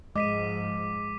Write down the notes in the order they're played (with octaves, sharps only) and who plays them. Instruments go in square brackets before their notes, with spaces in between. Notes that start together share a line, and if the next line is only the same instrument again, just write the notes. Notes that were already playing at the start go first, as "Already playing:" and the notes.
[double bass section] G#2 F3 [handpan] G#3 [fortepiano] D#5 [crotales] D6 B6 D#7